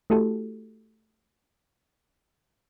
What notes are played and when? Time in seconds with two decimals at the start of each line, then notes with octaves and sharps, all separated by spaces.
0.10 A3 E4 F#4 G4 A4